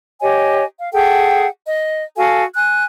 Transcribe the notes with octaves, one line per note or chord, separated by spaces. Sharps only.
G4 C#5 D#5 G#5
F5
G#4 A4 F#5 G5
D#5
F#4 A4 F5 G#5
G#5 F#6